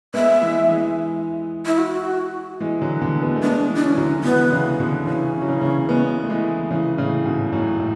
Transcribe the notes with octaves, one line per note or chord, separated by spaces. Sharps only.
G#3 B3 E5
E3 G#3
E3 G#3
E4
F#4
E3 G#3
D3 F#3
B2 D3
G#3 B3
A3
G#3 B3 D4
E3 G#3
D4
C#4
E3
D3 F#3
E3
D3 F#3 B3
C#3 E3
B2 D3
C#3 E3 C#4
E3
F#3
C#3 E3
C#3 E3
G#3 B3
A3
E3 G#3
C#3 E3
A2 C#3
G#2 B2
F#2 A2
A2